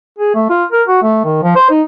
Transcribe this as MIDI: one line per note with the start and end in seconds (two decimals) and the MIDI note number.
0.19 0.34 68
0.35 0.47 57
0.50 0.65 65
0.72 0.83 70
0.88 0.99 66
1.03 1.21 57
1.25 1.43 51
1.43 1.54 53
1.56 1.67 72
1.70 1.82 63